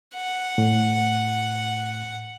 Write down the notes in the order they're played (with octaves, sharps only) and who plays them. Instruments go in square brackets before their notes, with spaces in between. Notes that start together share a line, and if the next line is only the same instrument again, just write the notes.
[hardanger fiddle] F#5
[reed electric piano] A2